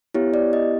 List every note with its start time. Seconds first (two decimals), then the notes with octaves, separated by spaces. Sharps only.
0.14 B3 E4 G4 C#5
0.34 D5
0.53 D#5